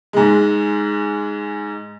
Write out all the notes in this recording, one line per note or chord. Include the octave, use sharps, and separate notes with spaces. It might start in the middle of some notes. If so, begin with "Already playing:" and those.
G#2 G#3